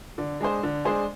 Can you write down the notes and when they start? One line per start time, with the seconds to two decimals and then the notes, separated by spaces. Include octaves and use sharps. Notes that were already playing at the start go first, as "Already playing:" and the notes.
0.18 D3
0.41 G#3 D4 G#4 C5
0.63 D3
0.85 G#3 D4 G#4 C5